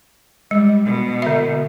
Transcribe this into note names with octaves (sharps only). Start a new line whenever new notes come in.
G3 G#3
B2
D3 E5